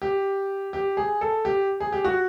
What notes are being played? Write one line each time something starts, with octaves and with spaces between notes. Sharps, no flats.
G4
G4
G#4
A4
G4
G#4
G4
F#4